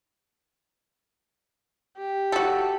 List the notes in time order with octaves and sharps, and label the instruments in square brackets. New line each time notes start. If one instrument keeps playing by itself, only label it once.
[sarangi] G4
[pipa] F#4 A4